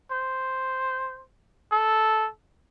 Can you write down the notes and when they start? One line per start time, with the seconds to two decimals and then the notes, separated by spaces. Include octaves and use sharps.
0.11 C5
1.72 A4